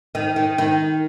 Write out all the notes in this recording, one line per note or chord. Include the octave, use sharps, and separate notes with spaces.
D#3
D#3
D#3